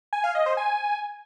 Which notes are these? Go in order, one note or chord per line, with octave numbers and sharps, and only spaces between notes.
G#5
F5
D#5
C5
G#5